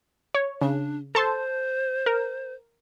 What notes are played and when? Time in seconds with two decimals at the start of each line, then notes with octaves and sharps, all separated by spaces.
0.34 C#5
0.61 C#3 D4
1.15 A4 C5 A5 C6
2.06 A#4